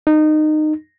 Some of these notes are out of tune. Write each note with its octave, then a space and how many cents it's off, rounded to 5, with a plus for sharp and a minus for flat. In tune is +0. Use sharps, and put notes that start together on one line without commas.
D#4 -20